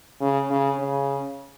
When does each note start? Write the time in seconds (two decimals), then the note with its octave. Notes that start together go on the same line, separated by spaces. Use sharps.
0.21 C#3
0.50 C#3
0.79 C#3